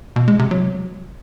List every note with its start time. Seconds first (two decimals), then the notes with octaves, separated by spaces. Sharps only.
0.16 B2
0.28 G#3
0.39 C3
0.51 F#3